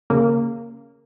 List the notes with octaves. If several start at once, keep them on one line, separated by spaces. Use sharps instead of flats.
C#3 A#3